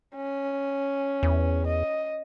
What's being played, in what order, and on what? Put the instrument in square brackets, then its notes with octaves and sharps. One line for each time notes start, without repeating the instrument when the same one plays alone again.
[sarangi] C#4
[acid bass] E2
[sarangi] D#5